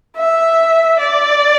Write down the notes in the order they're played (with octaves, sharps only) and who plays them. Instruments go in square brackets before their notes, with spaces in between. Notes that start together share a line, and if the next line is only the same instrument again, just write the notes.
[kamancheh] E5
D5